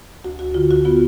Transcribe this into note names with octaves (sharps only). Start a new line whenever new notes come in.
D2 F#4
D2 F#4
D3 F4
D2 F#4
B3 F4